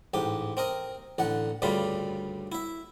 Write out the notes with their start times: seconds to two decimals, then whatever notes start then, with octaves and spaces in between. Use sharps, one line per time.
0.14 A1 G#2 G4
0.57 C4 A#4 D#5
1.18 A1 D3 F#5
1.62 D2 G2 C#3 G3 F4 B5
2.52 E4 E5